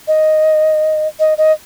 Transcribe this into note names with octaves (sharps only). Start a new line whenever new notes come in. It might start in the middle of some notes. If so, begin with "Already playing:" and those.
D#5
D#5
D#5